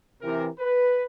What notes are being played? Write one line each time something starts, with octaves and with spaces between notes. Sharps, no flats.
C3 E3 A#4
B4